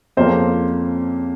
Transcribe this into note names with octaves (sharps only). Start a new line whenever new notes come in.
F2 C#3 F3 A#3 C#4 C5